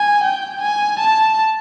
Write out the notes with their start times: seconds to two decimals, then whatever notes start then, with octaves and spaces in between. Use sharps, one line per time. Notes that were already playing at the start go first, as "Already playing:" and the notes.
Already playing: G#5
0.24 G5
0.61 G#5
0.99 A5